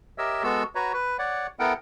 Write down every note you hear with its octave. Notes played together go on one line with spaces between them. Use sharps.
G4 A#4 C#5 D#5 E5 E6
G#3 B3 F#4 A4 E6
F#4 B4 C#5 A#5
B4
C#5 D5 F#5
B3 E4 A4 A#4 F#5 G5